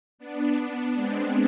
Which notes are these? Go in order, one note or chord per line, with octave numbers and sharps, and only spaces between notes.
B3 D4
G#3 C4